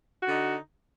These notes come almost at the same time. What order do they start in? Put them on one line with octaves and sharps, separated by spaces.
F#4 D3 D#4